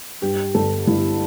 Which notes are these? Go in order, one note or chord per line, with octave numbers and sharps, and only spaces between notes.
G2 G4
G1 A4
G1 E4